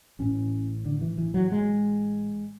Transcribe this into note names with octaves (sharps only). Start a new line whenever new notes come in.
A1 A2 C#4
D3
E3
E3
F#3
G#3